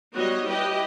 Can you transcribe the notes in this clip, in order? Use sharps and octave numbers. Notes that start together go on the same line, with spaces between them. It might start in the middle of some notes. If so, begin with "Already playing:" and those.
G3 B3 D#4 F#4 C#5 D#5
E4 G4 B4 D#5 G5